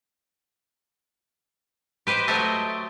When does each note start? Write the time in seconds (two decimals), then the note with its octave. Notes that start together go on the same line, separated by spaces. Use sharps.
2.07 G4 B4 C5 D#5
2.28 F#3 A3 G4 C5 D#5 E5